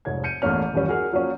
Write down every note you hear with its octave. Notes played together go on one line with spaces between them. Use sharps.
F1 F2 G#2 C#5 G#6
G6 C#7 D#7
A1 E2 A3 A#3 C#4 F6
D#1 A1 F#2 G3 C#4
F#4 G#4 A#4 F6
F3 F#3 A#3 C#4